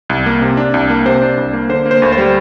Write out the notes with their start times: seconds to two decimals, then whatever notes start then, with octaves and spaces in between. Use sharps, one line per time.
0.10 C2
0.26 A#3
0.42 C3
0.57 D4
0.74 C2
0.90 A#3
1.05 C3 C5
1.22 D4
1.37 C2
1.53 A#3
1.69 D3 C5
1.86 A#3
1.91 C5
2.02 D2
2.12 C5
2.18 G3